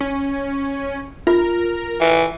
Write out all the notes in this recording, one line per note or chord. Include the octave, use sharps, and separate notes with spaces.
C#4
F4 A#4
E3